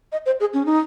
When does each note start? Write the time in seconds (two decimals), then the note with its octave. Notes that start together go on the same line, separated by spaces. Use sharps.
0.12 D#5
0.26 C5
0.40 G#4
0.54 C#4
0.66 D#4